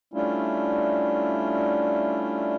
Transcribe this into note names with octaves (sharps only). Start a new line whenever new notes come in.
G3 A3 C#4 D4 E4 F4